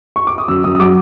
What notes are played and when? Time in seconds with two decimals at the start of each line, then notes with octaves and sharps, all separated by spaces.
0.16 C#6
0.27 D6
0.38 D#6
0.48 F#2 E6
0.64 F#2 D#6
0.75 D#6
0.80 F#3 D6